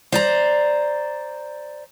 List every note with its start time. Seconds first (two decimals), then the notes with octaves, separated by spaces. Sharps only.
0.12 C5 D5 A#5